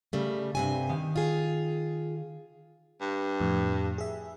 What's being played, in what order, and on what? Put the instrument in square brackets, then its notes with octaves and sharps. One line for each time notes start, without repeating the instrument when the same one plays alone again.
[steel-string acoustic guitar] C#3 G3 A3
G2 C3 G#5
[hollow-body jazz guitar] D#3 F5
[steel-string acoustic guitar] F4 G#4
[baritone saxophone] G2
[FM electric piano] F2 A2
G#4 E5